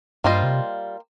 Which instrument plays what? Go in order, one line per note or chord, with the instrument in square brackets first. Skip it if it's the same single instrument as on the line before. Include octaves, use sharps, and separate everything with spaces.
[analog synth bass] G2 [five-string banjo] G3 A#3 F4 C5 D#5
[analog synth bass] C3